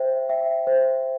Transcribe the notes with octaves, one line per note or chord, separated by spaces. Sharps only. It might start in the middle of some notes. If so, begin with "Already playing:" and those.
Already playing: C5 E5 G5
E5 G5
C5